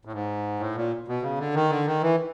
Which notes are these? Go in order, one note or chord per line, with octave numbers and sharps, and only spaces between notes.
A2
G#2
A2
A#2
B2
C#3
D3
D#3
D3
D#3
E3